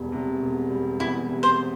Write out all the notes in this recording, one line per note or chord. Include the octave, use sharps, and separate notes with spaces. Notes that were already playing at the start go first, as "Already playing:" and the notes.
Already playing: E1 E2 G3
C3
E1
G3
E2 E4
C3
C5